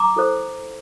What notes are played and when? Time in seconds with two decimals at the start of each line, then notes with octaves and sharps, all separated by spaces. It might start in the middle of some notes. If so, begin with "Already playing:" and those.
Already playing: A#5 D6
0.16 E4 A4 C5